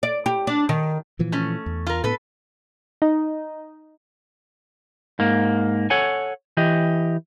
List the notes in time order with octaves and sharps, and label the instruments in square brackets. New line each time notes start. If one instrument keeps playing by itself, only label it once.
[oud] D5
G4
D4
D#3
[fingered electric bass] A#2 E3 F3
[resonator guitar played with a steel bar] A3 C#4
[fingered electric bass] E2
[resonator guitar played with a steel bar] F4 A#4
[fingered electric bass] A2 B3 [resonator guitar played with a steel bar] A4 B4
[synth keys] D#4
[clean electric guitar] G#2 A#3
A4 C#5 F#5 G#5
E3 G4 D#5